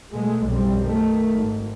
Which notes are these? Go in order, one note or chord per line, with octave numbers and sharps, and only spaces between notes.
B2 G#3 A3
B1 F#2 G3 C4
D#3 A3
G#1